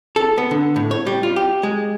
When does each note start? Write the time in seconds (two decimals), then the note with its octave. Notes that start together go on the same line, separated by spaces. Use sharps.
0.16 A4
0.38 B3
0.51 D3
0.76 A2
0.91 C#5
1.07 G3
1.23 F4
1.36 G4
1.63 G#3